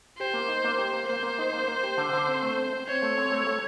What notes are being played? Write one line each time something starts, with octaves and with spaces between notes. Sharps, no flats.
G4 C5
A#3
D#4
A#3
G4
A#3
A#3 C5
A#3
D#4
A#3
A#3
G4
D3
D3
C4
A3
C4
C4
C4 C#5
A3
C4
A3
A3